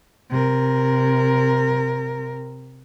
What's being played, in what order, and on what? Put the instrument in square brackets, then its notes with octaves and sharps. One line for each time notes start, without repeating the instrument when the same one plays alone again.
[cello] C3 A#4